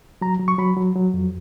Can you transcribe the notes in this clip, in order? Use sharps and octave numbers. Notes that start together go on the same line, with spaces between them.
F#3 A#5
F#3
C#6
F#3 B5
F#3
F#3
F2